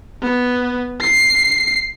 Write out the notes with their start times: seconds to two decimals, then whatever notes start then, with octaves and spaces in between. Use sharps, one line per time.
0.22 B3
1.01 C7